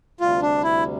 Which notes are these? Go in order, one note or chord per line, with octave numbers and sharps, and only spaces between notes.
D2 C3 G3 F4
D4
E4